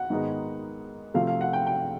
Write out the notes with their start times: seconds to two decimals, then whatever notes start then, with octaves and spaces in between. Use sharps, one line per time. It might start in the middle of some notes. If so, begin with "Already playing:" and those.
Already playing: F#5
0.10 G#2 D#3 G#3 B3 D#4
1.14 C3 F3 A3 F5
1.27 F5
1.41 F#5
1.53 G5
1.67 G5